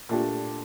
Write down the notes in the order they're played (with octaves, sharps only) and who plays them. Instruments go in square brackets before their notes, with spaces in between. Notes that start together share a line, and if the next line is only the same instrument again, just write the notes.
[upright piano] A#2 A3 D4 G4